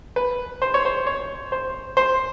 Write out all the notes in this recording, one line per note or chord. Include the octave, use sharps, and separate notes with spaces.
B4
C5
C#5
C5
C#5
C5
C5